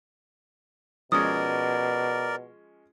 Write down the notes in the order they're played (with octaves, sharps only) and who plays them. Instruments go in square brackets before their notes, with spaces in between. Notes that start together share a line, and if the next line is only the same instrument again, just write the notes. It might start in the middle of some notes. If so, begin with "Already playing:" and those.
[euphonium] B2 [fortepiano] F3 G#3 C#4 [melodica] A#4 D5 [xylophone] D#6